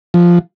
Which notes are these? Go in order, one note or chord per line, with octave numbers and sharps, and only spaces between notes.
F3